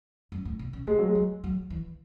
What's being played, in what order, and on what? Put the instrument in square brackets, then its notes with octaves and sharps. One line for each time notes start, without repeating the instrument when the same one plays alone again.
[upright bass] F#2
A2
B2
C#3
[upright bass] C#3 [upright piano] G#3
[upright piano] F#3
G#3
[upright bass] F#3
F#3
E3